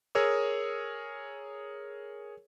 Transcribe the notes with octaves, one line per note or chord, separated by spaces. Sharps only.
G#4 A#4 C#5 D#6 E6